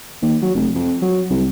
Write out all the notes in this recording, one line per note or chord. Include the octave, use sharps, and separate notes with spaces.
D#2
F#3
F1
F2
F#3
C2